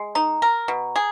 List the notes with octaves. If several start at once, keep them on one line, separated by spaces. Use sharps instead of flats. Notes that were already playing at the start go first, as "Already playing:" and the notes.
Already playing: G#3
D#4 A#5
A#4
B2
G#4